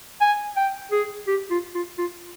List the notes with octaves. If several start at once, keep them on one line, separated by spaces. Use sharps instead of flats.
G#5
G5
G#4
G4
F4
F4
F4